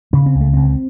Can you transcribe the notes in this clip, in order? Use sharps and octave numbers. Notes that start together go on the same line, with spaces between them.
C#3 C#4
C4
C#2
A3
C#2 C4